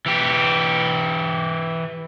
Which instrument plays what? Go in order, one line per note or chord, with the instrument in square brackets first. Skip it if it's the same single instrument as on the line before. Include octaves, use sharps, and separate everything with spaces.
[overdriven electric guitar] E3 G4